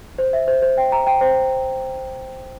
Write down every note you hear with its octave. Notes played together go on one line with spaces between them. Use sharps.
C5
E5
C5
C5
G5
A#5
G5
C5